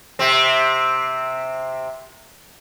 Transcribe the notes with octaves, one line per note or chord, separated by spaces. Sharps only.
C3 C4